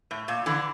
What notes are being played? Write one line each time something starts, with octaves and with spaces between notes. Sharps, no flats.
A2
A#2
D3 E3